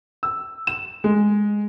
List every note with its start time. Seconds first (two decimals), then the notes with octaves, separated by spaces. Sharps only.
0.23 E6
0.67 E7
1.04 G#3